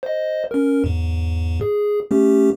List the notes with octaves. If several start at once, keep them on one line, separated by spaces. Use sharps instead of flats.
C5 D#5
C#4 A#4
E2 G#2
G#4
A3 C#4 G4